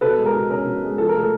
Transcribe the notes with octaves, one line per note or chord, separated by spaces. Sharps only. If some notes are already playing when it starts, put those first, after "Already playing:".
B2 A4 B4
G#3
A#4
B2
C#4 A#4
B2
G#3
F3 A4
A#4
A3
A4